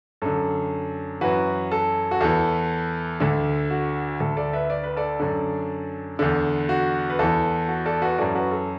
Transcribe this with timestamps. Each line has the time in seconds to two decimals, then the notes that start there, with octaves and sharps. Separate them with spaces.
0.22 F#2 D3 A4
1.21 F#2 E3 F#4 B4
1.71 A4
2.11 F#4
2.21 E2 E3 A4
3.20 D2 D3
3.70 F#4
4.20 D2 D3 A4
4.37 A4 D5
4.53 B4 E5
4.70 D5
4.83 B4
4.96 A4 D5
5.20 F#2 D3
6.19 E2 D3
6.69 F#4
7.10 B4
7.19 E2 E3 A4
7.68 F#4
7.85 A4 D5
8.02 F#4 B4
8.18 F#2 E3 A4 D5
8.35 F#4 B4
8.51 A4